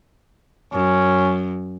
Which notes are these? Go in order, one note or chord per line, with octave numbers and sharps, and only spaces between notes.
F#2 C#4